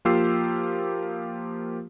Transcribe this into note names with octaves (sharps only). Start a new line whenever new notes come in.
F3 A#3 F4 G4 E6 C7